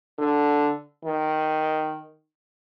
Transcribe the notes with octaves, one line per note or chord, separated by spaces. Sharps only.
D3
D#3